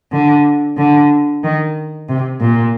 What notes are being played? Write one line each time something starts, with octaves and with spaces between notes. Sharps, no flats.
D3
D3
D#3
C3
A#2